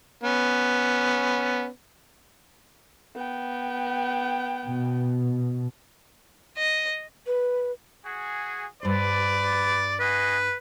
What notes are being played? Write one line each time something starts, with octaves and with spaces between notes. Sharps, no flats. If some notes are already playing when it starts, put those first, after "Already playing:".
B3 C#4
B3 G5
B2
D#5
B4
F#4 G#4
G2 B4 C5 D5
F#4 G#4 B4 D#5